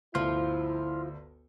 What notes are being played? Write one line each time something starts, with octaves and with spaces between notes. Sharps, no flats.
G1 D2 F3 E4 F4